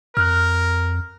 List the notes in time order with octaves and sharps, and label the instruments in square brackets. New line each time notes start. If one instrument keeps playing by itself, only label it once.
[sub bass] F2 [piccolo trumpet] A#4 [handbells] F6 F#6